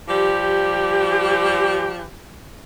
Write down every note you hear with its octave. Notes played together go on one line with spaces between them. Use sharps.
F3 G3 G4